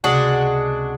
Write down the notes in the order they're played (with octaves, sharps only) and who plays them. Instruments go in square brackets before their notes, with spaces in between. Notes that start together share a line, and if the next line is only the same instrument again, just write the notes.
[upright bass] C#2 C3 [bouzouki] G#3 D4 F#4